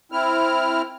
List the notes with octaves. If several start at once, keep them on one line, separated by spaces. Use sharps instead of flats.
C4 E4 F6